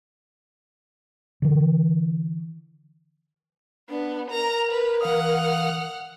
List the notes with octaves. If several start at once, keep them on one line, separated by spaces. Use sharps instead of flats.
D3 E3
B3 D4
A#4 A#5 F7
B4
E3 F5 F#5 D#6 F6